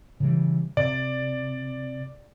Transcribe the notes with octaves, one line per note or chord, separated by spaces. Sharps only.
C#3 E3 G3
C3 D5